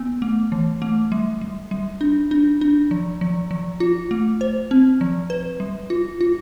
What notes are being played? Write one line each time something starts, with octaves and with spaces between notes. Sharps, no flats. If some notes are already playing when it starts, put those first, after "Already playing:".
Already playing: B3
A3
E3
A3
G3
G3
G3
D4
D4
D4
F3
F3
F3
F4
A3
C5
C4
F3
B4
G3
F4
F4